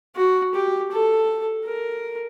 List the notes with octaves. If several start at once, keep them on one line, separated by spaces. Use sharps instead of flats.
F#4
G4
A4
A#4